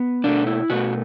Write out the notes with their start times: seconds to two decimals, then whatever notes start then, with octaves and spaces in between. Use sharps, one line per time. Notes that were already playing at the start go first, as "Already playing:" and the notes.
Already playing: B3
0.24 B2 A3 D4
0.47 E4
0.70 B2 A3 F#4